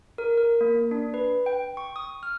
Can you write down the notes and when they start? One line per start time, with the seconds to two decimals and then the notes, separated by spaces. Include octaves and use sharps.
0.18 A#4
0.37 A#4
0.61 A#3
0.91 D4
1.14 B4
1.46 G5
1.77 C#6
1.96 D#6
2.23 F6